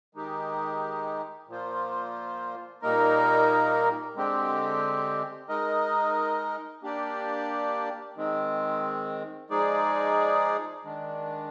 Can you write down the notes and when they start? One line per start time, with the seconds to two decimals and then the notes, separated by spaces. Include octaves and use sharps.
0.15 D#3 G#3 D#4 G4
1.48 A#2 F3 A#3 F4 C5
2.82 A#2 G3 A#3 D#4 A#4
4.15 D3 G#3 C4 G4
5.49 G#3 D#4 A#4 D#5
6.83 A#3 D4 G4 D5
8.16 D#3 G#3 C4
9.50 F3 G#3 D#4 G#4 D5
10.84 D#3 G#3 D4